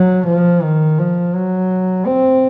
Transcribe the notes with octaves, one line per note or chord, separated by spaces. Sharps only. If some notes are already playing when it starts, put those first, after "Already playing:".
Already playing: F#3
F3
D#3
F3
F#3
C4